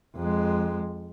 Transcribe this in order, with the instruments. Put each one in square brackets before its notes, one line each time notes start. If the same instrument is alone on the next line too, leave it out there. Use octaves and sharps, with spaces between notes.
[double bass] F2 G#3